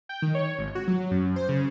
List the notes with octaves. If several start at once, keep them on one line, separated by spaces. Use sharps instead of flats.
G5
D#3
C#5
G#1
F#4
F#3
F#2
C5
C#3